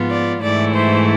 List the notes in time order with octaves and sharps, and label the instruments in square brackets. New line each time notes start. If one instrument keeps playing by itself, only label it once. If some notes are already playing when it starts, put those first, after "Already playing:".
Already playing: [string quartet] G#2 F3 B3 F4
D5
G#2 E3 A3 E4 D5
C5